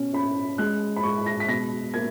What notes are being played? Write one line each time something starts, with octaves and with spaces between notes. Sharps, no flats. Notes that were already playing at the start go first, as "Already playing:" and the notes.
Already playing: B2 C#4
C#4 B5
G#3 F#6
B5
G#3 C#6
A#6
B6
B2 A#6
A#3 G#6